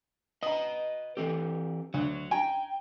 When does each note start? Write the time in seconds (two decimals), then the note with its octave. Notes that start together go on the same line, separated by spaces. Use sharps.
0.43 B4 D#5 A#5 D#6
1.17 E3 A3 C4 G4
1.94 D2 F#3
2.31 G5 G#5 A#5